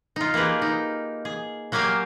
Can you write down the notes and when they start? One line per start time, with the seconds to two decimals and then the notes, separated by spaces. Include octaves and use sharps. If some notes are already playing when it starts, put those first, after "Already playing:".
0.16 D#4 F4
0.34 A#3 G4 G#4 B4
0.62 D#4
1.25 G#4
1.72 F#3 A#3 G4 F5 G#5